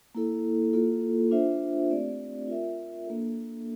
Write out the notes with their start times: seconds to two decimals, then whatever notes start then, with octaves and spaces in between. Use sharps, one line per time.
0.15 A#3 E4 A4
0.73 A#3 F4 A4
1.31 D4 F4 C5 E5
1.90 A3 C4 G4 D5
2.48 F4 A#4 E5
3.07 A#3 D4 A4